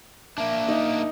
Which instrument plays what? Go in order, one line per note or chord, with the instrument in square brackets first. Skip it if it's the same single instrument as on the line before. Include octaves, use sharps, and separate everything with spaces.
[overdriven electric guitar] A#3 D4 [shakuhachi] E5
[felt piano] D#4